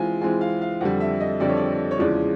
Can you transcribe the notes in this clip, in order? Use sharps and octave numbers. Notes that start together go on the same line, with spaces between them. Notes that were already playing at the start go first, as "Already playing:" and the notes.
Already playing: E3 G#3 C4 F4 G#5
E3 G#3 C4 F4 G#5
F5
F5
F2 D3 G3 F#5
E5
D#5
F2 D3 G3 D5
C#5
D5
C#5
E2 C#3 F3 G#3 C#4 D5